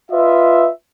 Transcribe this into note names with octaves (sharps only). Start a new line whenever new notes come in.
F4 B4 D#5 E5